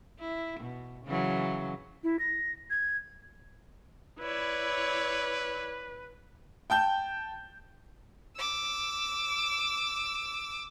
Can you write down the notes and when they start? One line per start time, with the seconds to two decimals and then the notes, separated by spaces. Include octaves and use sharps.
0.20 E4
0.60 B2
1.06 C#3 E3 F#3
2.03 E4
2.19 A#6
2.70 G#6
4.20 E4 B4 C#5 D5
6.70 G5 A5 G6
8.37 D6 E6